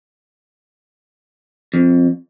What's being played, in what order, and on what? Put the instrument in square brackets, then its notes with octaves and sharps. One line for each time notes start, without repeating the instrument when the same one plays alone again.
[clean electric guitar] F2